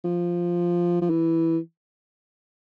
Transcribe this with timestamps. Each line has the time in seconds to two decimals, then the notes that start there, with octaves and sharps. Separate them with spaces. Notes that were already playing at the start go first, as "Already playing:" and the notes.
0.04 F3
1.02 F3
1.10 E3